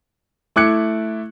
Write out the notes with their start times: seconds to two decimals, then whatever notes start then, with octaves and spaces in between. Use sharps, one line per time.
0.56 A3 E4 D6 F#6 G#6 C#7